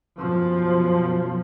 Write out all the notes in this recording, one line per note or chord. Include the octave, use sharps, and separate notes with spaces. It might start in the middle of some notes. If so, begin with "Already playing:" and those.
F#2 B2 F3